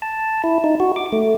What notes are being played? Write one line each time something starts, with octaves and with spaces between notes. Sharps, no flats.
A5
E4
D#4
F#4
D6
A3